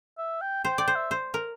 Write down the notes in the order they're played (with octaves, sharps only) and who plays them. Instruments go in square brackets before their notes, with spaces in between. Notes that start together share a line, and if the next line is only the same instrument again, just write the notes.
[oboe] E5
G5
[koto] C5 [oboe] G5
[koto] D5 [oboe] G5
[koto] C5
[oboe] E5
[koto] C5
A#4